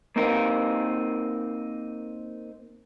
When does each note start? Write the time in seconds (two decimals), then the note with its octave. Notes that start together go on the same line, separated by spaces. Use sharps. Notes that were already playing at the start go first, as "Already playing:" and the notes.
0.16 A#3 C4 D#4 A#4